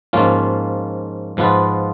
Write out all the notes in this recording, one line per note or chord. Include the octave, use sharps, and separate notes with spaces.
G#2 F3 A#3 C#4 F4
G#2 F3 B3 F4 B4